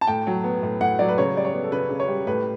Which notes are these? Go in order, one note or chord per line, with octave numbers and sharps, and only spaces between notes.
A5
A2 G5
F#3
B3
A2
A2 F#5
F#3 D5
B4
C#3 C#5
G3 D5
C#5
B3
A4
C#3 B4
C#3
C#5
G3
A2 B4